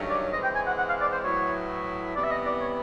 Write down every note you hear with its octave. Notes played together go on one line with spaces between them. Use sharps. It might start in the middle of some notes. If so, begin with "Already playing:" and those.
Already playing: G2 D#3 F#3 A3 C#4
D5
E3 G#3 C4 D#5
G5
G#5
F#5
F#5
F5
D5
C5
A2 F#3 B3 E4 C#5
C3 E3 G3 B3 D5
E5
D#5
D5
C#5